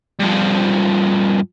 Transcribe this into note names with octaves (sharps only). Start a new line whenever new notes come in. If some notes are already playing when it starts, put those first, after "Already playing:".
G2 F3